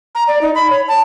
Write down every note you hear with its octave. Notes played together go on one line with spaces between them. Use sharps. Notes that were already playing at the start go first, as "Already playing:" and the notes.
A#5
D5
D#4
B5
C#5
A5